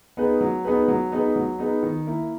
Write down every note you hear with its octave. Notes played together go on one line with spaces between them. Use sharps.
B3 D#4 G#4 B4
F#3
B3 D#4 G#4 B4
F#3
B3 D#4 G#4 B4
F#3
B3 D#4 G#4 B4
D#3
A#3 E4